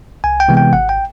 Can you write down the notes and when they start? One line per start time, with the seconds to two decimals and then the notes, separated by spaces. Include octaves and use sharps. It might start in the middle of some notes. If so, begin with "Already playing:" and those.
0.24 C2 G#5
0.40 G5
0.48 C3 E3 G#3 B3
0.57 G5
0.73 G#1 F#5
0.89 G5